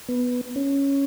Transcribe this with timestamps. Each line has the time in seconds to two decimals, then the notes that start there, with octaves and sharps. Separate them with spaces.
0.09 B3
0.56 C#4